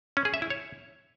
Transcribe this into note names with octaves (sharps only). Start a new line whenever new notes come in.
C#4
G#4
E5
E4
C#5